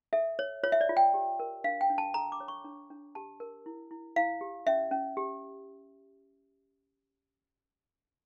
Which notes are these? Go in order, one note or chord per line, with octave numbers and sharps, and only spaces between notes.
A4 E5
C#5
F4 C#5
E5
D5
F4
G5
G4
A#4
D4 F5
G5
D4
A5
A4 A#5
D6
C#5
C#6
D4
D4
G4 A5
A#4
E4
E4
E4 F5
G4
C#4 E5
C#4
G4